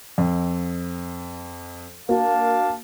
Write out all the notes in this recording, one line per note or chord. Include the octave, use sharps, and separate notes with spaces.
F2
A#3 D4 F#4 F5 A5